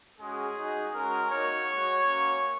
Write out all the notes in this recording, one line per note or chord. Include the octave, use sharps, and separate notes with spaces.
G#3 C#4 F#4 G#4
G#3 D#4 F#4
G#3 C#4 F#4 A#4
A#3 D#4 F#4 C#5
G#3 F#4
A#3 C#4 F#4